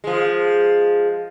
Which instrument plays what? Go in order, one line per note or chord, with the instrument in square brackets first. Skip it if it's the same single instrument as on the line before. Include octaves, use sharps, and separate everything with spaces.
[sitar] F3 G#3